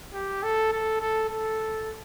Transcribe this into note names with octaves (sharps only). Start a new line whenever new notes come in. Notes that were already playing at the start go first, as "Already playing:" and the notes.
G4
A4
A4
A4
A4